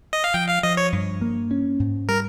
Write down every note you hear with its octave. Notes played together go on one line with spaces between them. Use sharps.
D#5
F5
F3 G5
F5
F3 D#5
C#5
G2
A#3
C#4
G#2
G3 A#4